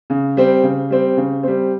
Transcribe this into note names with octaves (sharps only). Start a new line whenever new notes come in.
C#3
G3 C4
C#3
G3 C4
C#3
G3 C4